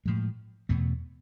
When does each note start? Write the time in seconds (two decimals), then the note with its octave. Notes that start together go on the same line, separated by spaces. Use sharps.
0.06 A2 F3 G#3
0.69 E2 B2 A3